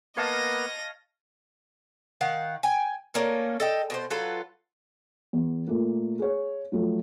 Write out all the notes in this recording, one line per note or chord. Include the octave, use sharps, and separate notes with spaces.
A#3 B3 B4 C#5 D#5 F5 A5 A#6
D#3 F5 F#5
G5 G#5
A3 A#3 C#4 A#4
A4 D#5 G5
B2 F#4 C5
F#3 F4 A4 B4
E2
A#2 A3 A#3
G#4 C#5
F3 F#3 A3